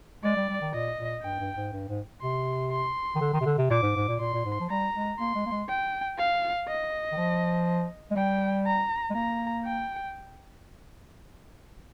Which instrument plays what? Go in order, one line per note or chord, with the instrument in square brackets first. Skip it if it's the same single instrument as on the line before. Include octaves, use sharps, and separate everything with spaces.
[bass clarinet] G#3 [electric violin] D5
[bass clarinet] G3
G3
D#3
[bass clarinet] A#2 [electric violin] D#5
[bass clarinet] A#2
[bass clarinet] G2 [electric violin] G5
[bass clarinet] G2
G#2
G2
G#2
[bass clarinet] C3 [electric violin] C6
[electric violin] C6
[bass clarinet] D#3
D3
D#3
C3
D3
C3
[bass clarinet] A#2 [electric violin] D6
[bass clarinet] G#2
G#2
A#2
[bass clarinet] A#2 [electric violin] C6
[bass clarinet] A#2
G#2
F3
[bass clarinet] G3 [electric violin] A#5
[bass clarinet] G#3
[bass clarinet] A#3 [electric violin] C6
[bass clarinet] G#3
A#3
G#3
[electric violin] G5
F5
D#5
[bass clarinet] D#3
F3
G#3
[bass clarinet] G3 [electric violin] G5
[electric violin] A#5
[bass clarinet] G#3
[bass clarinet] A#3 [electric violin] A#5
[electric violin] G5